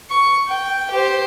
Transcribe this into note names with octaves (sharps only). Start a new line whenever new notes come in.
C#6
G5
G4 C5